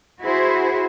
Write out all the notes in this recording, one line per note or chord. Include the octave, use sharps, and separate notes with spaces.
E4 F#4 G#4 C5